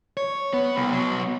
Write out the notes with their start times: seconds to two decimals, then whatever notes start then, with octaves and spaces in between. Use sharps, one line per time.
0.17 C#5
0.53 B3
0.76 C2
0.93 F#3 B3